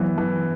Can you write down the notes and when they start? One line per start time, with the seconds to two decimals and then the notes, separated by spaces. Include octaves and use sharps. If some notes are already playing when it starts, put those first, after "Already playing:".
Already playing: E3 F#3 B3
0.18 E3